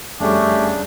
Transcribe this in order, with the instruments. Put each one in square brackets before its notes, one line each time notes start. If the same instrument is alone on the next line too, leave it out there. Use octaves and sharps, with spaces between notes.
[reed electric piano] F2 G3 [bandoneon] C#3 D4 [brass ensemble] A3 [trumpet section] C#4 G4